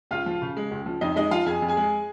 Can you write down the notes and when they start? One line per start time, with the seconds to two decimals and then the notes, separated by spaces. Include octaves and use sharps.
0.11 C#2 F4 F5
0.26 F3
0.41 C#3
0.57 G#3
0.71 C#2
0.86 F3
1.01 F2 D#4 D#5
1.16 G#3 D#4 D#5
1.31 F3 F4 F5
1.46 F2 G#4 G#5
1.62 F2
1.68 G#4 G#5
1.77 G#3